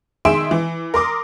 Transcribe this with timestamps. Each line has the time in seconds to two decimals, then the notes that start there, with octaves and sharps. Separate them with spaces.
0.25 D#3 G#4 E5 C6 D7 E7
0.51 E3
0.94 A#4 C6 D6 D#6